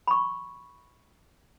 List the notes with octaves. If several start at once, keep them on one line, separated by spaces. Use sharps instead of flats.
B5 C#6